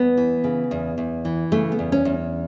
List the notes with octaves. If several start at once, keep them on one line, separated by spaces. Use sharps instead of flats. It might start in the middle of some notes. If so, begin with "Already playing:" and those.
Already playing: E2 B3
E3
C#3
E2
E2
E3
C#3 A3
B3
E2
C#4
E2